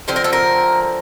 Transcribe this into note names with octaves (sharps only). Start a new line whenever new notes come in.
D3 F3 C4 C5
A#4
A4
A#4